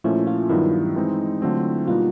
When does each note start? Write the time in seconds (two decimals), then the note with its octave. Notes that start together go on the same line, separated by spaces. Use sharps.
0.04 A#2 F3 A3 C#4 E4
0.27 F4
0.49 G2 D#3 F#3 B3 E4
0.96 E3 G#3 C4 D#4
1.42 D3 F#3 A3 C4 F4
1.88 B2 G3 A#3 D#4 F4 F#4